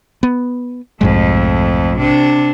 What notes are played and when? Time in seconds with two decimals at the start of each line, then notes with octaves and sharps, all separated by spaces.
0.23 B3
1.01 B1 F2 G#2 G#3 A3
1.99 C3 D4